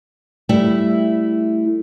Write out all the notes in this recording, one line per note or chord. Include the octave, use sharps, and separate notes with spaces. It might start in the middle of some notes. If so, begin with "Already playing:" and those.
G3 A3 E4 E5